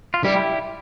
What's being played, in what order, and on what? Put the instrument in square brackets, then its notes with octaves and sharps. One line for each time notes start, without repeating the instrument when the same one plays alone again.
[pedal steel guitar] F4
[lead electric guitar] G3 [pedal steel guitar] E4 G4